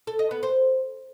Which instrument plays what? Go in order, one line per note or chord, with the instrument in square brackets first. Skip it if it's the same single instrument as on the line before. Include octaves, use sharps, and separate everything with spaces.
[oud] A4
D#5
B3
C5